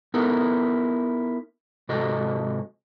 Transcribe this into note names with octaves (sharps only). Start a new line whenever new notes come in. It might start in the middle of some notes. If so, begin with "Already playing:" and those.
B3 D#4 E4 A4 A#4
G#2 C3 F#4 A4 D#5